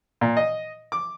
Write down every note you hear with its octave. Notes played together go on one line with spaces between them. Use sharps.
A#2
D#5
D6